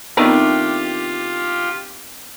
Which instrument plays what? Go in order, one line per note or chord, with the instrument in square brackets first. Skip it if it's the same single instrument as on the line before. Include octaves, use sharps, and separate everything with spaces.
[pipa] D#3 A3 D4 [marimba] B3 C4 D#4 [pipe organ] F4 G4